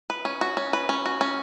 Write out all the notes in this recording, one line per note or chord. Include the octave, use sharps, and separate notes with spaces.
B4
C#4
F#4
C#4
B4
C#4
F#4
C#4